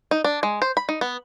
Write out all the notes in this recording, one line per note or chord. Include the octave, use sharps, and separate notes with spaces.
D#4
D4
G#3
C5
B5
D#4
B3